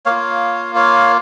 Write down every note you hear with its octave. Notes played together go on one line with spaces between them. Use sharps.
A#3 F4 C#5 F5
C#5 F5